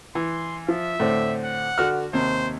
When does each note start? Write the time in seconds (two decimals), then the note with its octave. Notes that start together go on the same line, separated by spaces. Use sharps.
0.15 E3 C6
0.68 F3 E5
1.00 A2 D3 C4
1.45 F#5
1.78 D3 F#4 F6
2.13 D#2 C3 C5